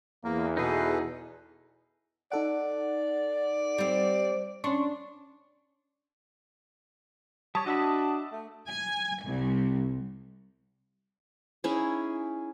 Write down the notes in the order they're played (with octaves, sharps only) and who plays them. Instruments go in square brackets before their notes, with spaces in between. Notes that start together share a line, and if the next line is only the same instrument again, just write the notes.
[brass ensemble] E2 [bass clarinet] A#3 [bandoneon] A#4
[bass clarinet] B2 [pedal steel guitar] D#4 G#4 [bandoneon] A4 B4
[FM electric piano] D#4 A4 F#5 [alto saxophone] D5
[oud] G3 C4
[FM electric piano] C#4 C6 C#6 [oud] D4
[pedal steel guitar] G3 C#5 [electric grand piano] A5 D#6
[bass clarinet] D4 [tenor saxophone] F#4 [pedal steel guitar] D#5 E5 B5
[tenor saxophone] A3
[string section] G#5
C2
[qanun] C#4 D#4 E4 G#4